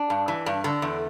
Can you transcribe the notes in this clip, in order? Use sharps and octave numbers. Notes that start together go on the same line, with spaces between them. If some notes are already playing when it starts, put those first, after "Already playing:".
Already playing: D4
G2
E3
G2
D3
E2